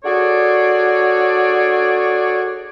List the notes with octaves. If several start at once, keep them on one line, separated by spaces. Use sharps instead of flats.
D4 F#4 G#4 A4 C#5 D5